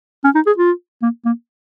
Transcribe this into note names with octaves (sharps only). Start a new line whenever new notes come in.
C#4
D#4
G#4
F4
A#3
A#3